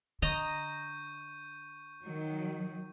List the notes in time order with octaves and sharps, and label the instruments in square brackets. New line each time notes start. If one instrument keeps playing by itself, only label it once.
[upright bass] D3 [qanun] D#5 A#5 [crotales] C#6 G6 D#7
[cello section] D#3 F#3